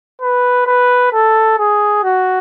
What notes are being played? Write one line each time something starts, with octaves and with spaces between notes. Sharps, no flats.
B4
B4
A4
G#4
F#4